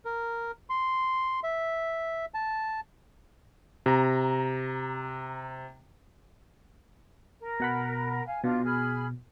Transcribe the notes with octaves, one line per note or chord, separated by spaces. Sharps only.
A#4
C6
E5
A5
C3 A#5
A#4
B2 F#5 B5
F5 G#5
B2 D4 F4
G#4 B5 F6